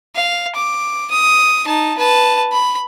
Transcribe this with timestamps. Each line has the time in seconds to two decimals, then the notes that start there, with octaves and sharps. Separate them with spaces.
0.16 F5
0.56 D6
1.11 D#6
1.66 D#4 A5
1.98 B4 A5
2.52 B5